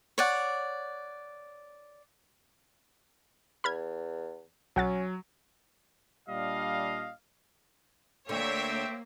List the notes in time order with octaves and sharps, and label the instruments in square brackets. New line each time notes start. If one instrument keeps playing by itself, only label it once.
[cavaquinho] C#5 D5 F#5
[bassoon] E2 [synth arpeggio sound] B5 F6 G#6
[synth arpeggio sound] B1 F#5 A6 [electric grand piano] F#3 [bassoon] C#4
[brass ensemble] A#2 G3 D4 D#5 F5
[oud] D2 D3 [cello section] A#3 [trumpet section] C4 G4 G5 [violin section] C#5 E5